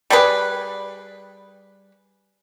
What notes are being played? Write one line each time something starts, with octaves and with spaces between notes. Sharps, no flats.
G3 G4 G#4 B4